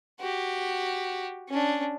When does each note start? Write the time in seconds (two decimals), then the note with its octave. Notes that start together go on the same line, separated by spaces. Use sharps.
0.20 F#4 G4
1.49 C#4 D4